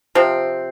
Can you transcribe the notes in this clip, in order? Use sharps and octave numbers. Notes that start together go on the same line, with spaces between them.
C3 F3 C4